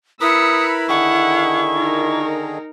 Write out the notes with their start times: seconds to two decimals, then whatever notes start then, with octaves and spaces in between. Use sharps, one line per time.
0.21 E4 A#4 B4 B5 D#6 E6 C#7
0.89 D3 D#3 G#4 F#5 C#6
1.74 D#4 A#4